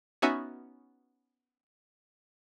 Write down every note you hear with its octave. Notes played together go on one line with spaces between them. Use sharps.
B3 C#4 D#4 F#4 E5 G#5